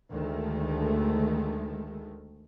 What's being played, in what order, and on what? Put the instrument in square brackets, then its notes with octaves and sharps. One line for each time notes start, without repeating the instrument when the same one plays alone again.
[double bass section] D2 D#3 G#3 A3